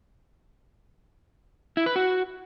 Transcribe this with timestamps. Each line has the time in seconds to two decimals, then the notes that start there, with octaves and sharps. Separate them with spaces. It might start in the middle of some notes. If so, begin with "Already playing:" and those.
1.77 E4
1.86 B4
1.96 F#4